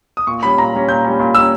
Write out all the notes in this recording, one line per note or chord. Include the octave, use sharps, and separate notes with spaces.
D#6
A#2 C#6
G3 C#4 B5
A#2 A#5
G3 C#4
A#2 G6
G3 C#4
A#2
G3 C#4 E6